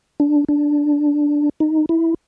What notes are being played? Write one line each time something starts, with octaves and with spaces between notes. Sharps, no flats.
D4
D4
D#4
E4